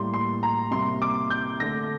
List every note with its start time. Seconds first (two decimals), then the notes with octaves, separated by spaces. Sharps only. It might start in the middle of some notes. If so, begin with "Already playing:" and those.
Already playing: A2 G3 A#3 C6
0.14 C6
0.43 A#5
0.71 C3 G3 A#3 C6
1.02 D6
1.30 G6
1.60 D3 A3 A#6